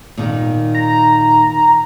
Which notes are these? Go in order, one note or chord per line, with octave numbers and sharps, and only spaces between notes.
A#2 D#3
A#5